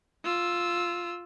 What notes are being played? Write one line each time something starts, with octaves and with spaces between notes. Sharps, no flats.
F4 E6